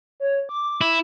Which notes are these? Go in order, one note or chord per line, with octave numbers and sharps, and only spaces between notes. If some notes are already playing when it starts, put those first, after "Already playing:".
C#5
D6
E4